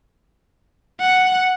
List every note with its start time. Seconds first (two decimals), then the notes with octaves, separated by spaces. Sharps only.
1.00 F#5